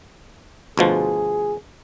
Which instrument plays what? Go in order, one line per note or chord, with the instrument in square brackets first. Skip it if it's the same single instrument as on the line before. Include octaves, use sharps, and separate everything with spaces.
[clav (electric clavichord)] D2 B2 F3 [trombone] G#4